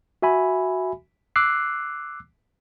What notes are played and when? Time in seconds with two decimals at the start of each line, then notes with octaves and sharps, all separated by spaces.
0.22 F#4 E5 G#5 B5
1.36 D6 E6 F#6 C7